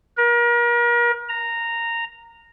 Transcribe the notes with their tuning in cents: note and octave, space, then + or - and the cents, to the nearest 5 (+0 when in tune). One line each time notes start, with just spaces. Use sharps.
A#4 +35
A#5 -10